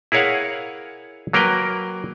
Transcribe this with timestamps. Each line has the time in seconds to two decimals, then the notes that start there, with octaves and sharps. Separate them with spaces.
0.12 E4 G#4 A#4 C#5 F5 F#5
1.33 F#3 A#3 A#4 B4 G5